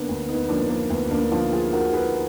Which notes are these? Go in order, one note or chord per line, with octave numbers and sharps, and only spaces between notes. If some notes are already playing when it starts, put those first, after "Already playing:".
Already playing: D3 A#3 B3 D4
D2
B3 D#4
F3 A#3 D4
A#3
D2 B3
A#3 D4
F3 D4 F4
F4 G#4
D3 F#4 A#4
G#4 B4